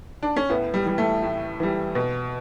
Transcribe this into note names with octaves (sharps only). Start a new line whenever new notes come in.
D4
C#4
A2 B3
G3
E3 G3
A3
A2
E3 G3
B2